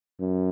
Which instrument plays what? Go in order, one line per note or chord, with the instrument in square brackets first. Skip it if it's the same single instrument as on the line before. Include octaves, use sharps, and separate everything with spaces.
[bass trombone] F#2